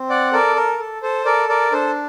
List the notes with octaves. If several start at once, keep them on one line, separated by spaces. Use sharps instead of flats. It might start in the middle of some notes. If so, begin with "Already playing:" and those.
Already playing: C4
D5 F#5
A4 A#4 D5
A#4
A4
A4 C5
A4 A#4 D5
A#4 D5
D4 A4 C5